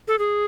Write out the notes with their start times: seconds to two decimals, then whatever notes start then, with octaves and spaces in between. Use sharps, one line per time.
0.08 A4
0.19 G#4